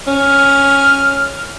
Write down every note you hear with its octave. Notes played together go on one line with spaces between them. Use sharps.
C#4 F6